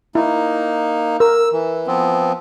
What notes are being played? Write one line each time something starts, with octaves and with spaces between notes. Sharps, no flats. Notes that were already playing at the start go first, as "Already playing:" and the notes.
A#3 D#4 E4
A#4 E6
E3
F3 B3 C4